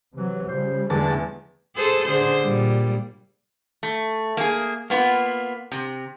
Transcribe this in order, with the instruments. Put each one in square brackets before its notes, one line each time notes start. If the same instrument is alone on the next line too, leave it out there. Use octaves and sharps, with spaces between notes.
[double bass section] C3 F#3 [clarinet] E3
[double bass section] C#3 F3 G3 [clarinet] C5
[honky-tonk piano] E2 G#3 [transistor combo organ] D3 A5 [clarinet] A3
[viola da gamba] G#4 A4 C5
D3 G#4 C5
A#2 G3
[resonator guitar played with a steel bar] A3
A#3 G#4
A#3 B3 F4
C3